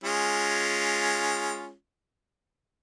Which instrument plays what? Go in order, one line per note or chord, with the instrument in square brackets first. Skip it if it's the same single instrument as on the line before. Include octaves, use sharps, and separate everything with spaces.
[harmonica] G#3 C#4 F4